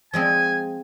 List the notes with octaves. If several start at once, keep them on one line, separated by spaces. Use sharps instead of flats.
F3 G#3 C4 G#5